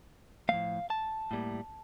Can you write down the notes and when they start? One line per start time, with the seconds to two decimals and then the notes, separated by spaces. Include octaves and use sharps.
0.49 A2 F3 A3 F5
0.90 A5
1.31 A2 G3 A#3